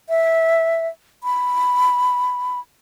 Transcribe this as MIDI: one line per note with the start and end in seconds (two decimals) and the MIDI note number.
0.09 0.88 76
1.24 2.60 83